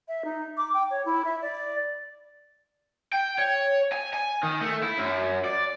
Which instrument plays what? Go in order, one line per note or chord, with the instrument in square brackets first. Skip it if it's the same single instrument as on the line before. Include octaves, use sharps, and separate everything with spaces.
[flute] E5
D#4
D6
G5
C#5
E4
E5
D5
[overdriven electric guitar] G5
C#5
G#5
G#5
D#3
A3
E4
F#2
D5